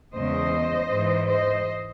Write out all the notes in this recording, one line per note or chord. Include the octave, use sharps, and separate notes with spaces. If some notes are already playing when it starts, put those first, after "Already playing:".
E2 C#3 G#3 C5 D#5
G#2 E3 G#3
C5 D#5